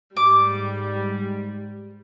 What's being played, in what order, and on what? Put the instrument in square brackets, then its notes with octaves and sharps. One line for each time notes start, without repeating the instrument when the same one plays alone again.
[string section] G#2 G3 [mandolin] D6